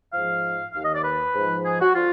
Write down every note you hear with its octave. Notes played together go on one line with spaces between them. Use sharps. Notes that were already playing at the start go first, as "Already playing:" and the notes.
G#2 F3 F5
D#2 D#3 F5
D#5
D5
B4
G#2 F3
G#4
F#4
D3 F3 F4